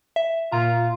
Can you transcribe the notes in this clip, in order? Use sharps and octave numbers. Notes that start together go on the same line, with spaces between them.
E5
A#2 F4 A#5